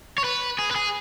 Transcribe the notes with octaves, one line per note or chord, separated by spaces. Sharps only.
C#5
B4
G#4
B4
G#4